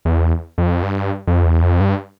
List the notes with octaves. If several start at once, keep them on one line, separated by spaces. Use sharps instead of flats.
E2
F2
G2
F2
E2
F2
G2